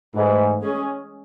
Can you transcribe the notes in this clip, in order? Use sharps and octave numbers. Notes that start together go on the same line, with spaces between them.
G#2 E3 A3 E4
G#3 C#4 G#4